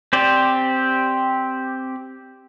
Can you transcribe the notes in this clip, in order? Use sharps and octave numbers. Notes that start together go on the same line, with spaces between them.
C4 G4 C5 D5